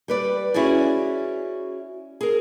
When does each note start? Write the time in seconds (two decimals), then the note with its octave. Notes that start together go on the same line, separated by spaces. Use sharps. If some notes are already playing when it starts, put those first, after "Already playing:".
0.08 G3 B4 D5
0.54 C#4 E4 F#4 G#4 D5
2.21 G#4 A#4